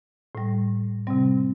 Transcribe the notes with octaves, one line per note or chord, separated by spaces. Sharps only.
A2 G3
C3 G3 C4